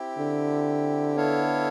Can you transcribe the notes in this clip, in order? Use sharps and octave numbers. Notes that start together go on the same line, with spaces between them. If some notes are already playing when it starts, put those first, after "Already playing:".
Already playing: C4 E4 G4
D3
B3 E4 A4 C#5 F5